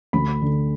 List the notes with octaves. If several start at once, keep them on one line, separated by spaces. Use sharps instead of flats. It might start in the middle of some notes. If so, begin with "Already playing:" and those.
D2 B5
D3